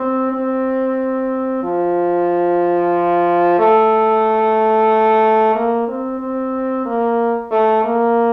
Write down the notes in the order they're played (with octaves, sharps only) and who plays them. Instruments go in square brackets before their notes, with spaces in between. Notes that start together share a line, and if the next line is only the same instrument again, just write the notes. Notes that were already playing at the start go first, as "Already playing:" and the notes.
Already playing: [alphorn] C4
C4
F3
A3
A#3
C4
C4
A#3
A3
A#3